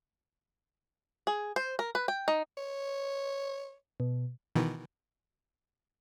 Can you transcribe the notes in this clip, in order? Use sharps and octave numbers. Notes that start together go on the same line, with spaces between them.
G#4
C5
A#4
B4
G5
D#4
C#5
B2
B2 D#3 E3